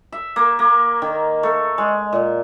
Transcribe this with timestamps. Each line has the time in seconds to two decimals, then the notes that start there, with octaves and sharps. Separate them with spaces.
0.12 E5
0.36 A#3
0.59 A#3
1.02 D#3
1.43 A3
1.78 G#3
2.13 A#2